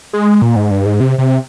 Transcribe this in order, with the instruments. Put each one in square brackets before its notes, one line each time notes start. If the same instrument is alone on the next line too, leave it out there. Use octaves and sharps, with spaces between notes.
[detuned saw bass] G#3
A#2
G#2
G2
G#2
C3
C3